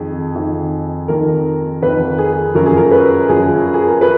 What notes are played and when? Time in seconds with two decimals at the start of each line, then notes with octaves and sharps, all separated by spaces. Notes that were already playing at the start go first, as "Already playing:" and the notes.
Already playing: F2 D#3 G#4
0.35 F2 D#3
1.08 F2 D#3 A#4
1.82 F2 D#3 B4
2.18 G#4
2.55 F#2 F3 A#4
2.66 G#4
2.77 A#4
2.91 B4
3.29 F#2 F3 G#4
3.74 G#4
3.88 A#4
4.01 F3 B4